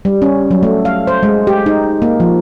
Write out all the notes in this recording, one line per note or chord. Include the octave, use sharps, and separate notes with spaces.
G3
C#4
F#3
A3
F5
C5
G#3
G4
D#4
A#3
F3